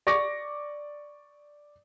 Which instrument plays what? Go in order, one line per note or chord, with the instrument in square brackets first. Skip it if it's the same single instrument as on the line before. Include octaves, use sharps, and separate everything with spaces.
[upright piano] D5 C#6 D6 A#6